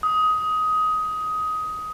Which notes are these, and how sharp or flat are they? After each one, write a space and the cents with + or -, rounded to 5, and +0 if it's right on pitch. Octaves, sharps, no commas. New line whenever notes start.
D#6 +15